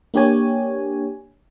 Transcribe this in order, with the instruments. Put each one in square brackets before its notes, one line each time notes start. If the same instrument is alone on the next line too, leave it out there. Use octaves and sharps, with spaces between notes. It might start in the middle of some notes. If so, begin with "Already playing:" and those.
[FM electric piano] A#3 D4 G4 C#5 G#5